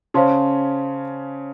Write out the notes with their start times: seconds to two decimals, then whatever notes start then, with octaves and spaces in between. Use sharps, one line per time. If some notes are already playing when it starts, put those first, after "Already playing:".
0.14 C#3 C#4 C5 F5 A5 C6